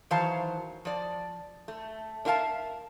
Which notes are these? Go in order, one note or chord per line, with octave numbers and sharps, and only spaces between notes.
D#3 E3 F#3 C5 F5 A5
F3 D5
A3
D4 A#4 E5 F5 A5